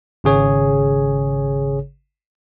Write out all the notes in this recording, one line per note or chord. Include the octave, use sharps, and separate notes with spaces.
G#1 C#3 G#4 C#5